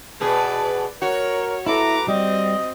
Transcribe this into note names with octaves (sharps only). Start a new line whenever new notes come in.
B2 G#4 B4 D5
F#4 A#4 C#5
E4 A4 B4 A#5 D6
G3 C4 D#5